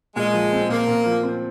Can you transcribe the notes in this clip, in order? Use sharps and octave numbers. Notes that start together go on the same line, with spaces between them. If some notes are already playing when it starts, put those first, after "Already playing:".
A#2 G#3
F3
C4
A#2 A#3
A#2
F3
C4